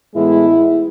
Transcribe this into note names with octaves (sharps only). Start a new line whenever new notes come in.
A2 E3 G#3 B3 E4